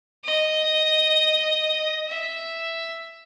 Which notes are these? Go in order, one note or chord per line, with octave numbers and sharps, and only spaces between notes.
D#5
E5